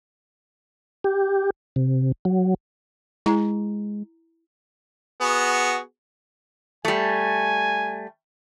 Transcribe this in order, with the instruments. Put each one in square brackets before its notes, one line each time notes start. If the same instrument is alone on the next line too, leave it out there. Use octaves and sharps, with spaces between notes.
[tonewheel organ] G4
C3
F#3
[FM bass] G#3 [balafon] E4 A#5
[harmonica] B3 F#4 G#4
[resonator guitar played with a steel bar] G3 A3 [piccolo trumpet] G#5